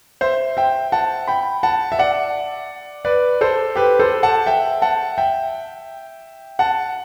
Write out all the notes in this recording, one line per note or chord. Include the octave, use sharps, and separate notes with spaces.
C5 E5
E5 G5
F#5 A5
G5 B5
F#5 A5
E5
D5 F#5
B4 D5
A4 C5
G4 B4
A4 C5
F#5 A5
E5 G5
F#5 A5
E5 G5
F#5 A5